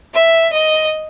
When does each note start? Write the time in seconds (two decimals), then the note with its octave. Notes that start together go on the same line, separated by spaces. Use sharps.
0.13 E5
0.51 D#5